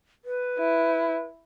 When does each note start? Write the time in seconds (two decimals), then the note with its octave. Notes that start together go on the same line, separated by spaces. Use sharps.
0.25 B4
0.58 E4